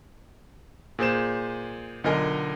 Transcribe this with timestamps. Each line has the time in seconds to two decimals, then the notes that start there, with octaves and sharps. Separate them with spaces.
0.99 A#2 G#4 C5 E7
2.04 B1 D3 F4 A#4 D#5 G#5